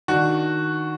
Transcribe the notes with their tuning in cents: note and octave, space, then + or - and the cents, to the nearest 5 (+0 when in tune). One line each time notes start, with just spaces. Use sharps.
D#3 +0 D4 +0 F#4 +0